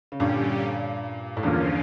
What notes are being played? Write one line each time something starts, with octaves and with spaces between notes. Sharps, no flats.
C#3
G2 A#2 D3 G3 C#4 G4
A2
E2 G2 D3 F3 A#3 C#4 F4